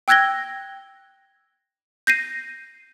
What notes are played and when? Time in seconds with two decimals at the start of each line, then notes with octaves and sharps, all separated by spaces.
0.08 G5 E6 F#6 G#6 A#6 G7
2.07 G6 A#6 C7 D#7